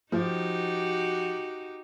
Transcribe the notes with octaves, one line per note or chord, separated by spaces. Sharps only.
F3 D#4 F#4 G4